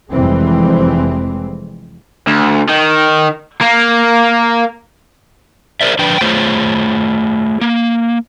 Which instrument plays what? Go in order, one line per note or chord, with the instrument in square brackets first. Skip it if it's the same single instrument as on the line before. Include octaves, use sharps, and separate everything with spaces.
[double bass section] F1 F2 E3 G3 G#3 C4
[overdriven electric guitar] D2
D#3
A#3
[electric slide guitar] G#4 A#4 C5 D5 E5
D3 F3 D4 B4 G5
A3 F4 G#4 C5 C#5
A#3